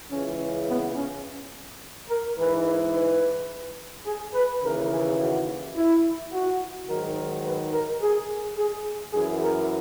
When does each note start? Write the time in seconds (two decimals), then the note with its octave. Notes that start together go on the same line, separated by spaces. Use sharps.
0.11 C#2 C#3 E3 C#4
0.68 B3
0.96 C#4
2.09 A#4
2.37 G#2 E3 B4
2.93 B4
4.06 G#4
4.34 B4
4.62 D#2 C#3 E3 A#4
4.91 G#4
5.19 F#4
5.76 E4
6.32 F#4
6.88 G#2 D#3 F#3 A#4
7.45 B4
7.73 A#4
8.01 G#4
8.57 G#4
9.13 F#2 G#4
9.17 E3
9.42 A#4